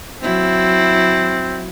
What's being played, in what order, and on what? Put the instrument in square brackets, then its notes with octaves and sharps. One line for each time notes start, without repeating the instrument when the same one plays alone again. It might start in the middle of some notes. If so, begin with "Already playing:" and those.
[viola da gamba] F#3 E4 [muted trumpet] C4